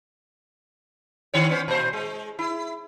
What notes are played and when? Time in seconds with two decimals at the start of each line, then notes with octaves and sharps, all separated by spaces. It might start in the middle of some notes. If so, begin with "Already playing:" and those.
1.34 D#3 C4 C#5
1.49 B3 C#4 C5
1.68 A#2 C5
1.93 G#3
2.39 E4